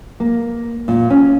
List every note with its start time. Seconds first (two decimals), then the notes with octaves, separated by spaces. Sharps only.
0.20 A#3
0.88 A#2
1.10 C#4